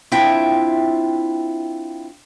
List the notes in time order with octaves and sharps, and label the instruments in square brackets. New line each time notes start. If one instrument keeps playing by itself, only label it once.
[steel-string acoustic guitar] C4 D4 E4 F4 E5 G5